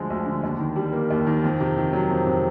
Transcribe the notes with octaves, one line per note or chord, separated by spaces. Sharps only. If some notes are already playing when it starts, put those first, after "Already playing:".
Already playing: D2 D3 F3 G#3
D2
D3
D#2
D#3
G3
A#3
D#2
D#3
F2
C3
D#3
F#3
F2
C3